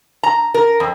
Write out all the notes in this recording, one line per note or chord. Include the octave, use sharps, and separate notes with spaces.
A#5
A#4
F2